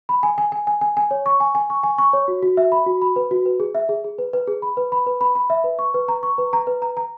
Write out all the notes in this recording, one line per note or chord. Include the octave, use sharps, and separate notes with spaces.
B5
G#5
G#5
G#5
G#5
G#5
G#5
C#5
C#6
G#5
G#5
C#6
G#5
C#6
C#5
F#4
F#4
E5
B5
F#4
B5
B4
F#4
B4
G#4
E5
G#4
G#4
B4
B4
G#4
B5
B4
B5
B4
B5
B5
E5
B4
C#6
B4
A#5
C#6
B4
A#5
B4
A#5
A#5